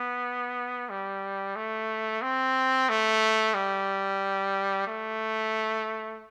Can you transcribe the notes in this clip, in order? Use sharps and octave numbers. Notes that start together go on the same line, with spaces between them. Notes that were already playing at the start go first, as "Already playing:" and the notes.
Already playing: B3
G3
A3
C4
A3
G3
A3